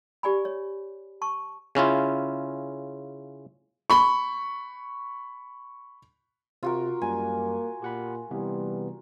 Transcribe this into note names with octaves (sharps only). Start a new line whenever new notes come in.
G4 D5 G#5 B5
C#5
A5 C#6
C#3 C#4 E4 F4
B5 C#6
C3 F4 F#4 A#4
F#2 G3 A#3 G#5
A#2 G4 F#5 B5
C3 E3 G3 B3